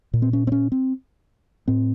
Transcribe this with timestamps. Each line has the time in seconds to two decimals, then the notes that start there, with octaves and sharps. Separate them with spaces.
0.13 A#2
0.22 C4
0.33 C#4
0.47 C4
0.52 C#4
0.72 C4
1.68 A2 C4